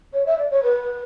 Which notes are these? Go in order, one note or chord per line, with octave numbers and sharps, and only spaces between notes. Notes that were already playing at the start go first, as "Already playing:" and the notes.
C#5
E5
D5
C#5
B4